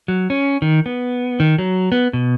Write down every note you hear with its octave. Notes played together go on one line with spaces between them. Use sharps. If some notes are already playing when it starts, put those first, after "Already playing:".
F#3
C#4
D#3
B3
D#3
F#3
B3
B2